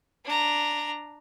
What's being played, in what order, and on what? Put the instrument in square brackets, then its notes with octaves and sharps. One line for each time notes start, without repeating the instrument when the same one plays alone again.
[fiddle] D4 A#5